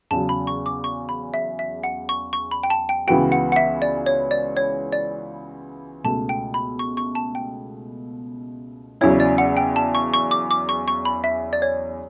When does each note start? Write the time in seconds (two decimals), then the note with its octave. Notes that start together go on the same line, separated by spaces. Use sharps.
0.11 E2 C#3 F#3 A5
0.29 B5
0.47 C#6
0.66 D6
0.84 C#6
1.09 B5
1.34 E5
1.59 E5
1.84 F#5
2.09 C#6
2.33 C#6
2.51 B5
2.63 G5
2.70 A5
2.89 G5
3.07 C#2 C#3 E3 B3 F#4 G5
3.32 F#5
3.52 F#5
3.56 E5
3.82 D5
4.06 C#5
4.31 D5
4.57 C#5
4.92 D5
6.04 C#2 B2 A3 A5
6.29 G5
6.54 B5
6.79 C#6
6.97 C#6
7.15 A5
7.35 G5
9.01 E2 C#3 F#3 C#4 E4 C#5
9.20 D5
9.38 F#5
9.57 G5
9.76 A5
9.95 C#6
10.14 C#6
10.31 D6
10.51 D6
10.69 C#6
10.88 C#6
11.05 B5
11.24 E5
11.53 D5
11.62 C#5